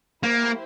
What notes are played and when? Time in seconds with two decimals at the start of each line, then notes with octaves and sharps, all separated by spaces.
0.23 A#3 E4 G4 C5